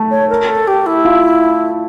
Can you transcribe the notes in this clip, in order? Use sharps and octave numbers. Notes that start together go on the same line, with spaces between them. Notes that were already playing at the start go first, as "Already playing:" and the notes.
Already playing: A3
C#5
A#4
A4
G4
E4
F4